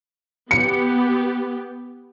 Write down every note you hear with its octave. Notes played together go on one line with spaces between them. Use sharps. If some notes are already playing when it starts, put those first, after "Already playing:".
B3 G4 C#7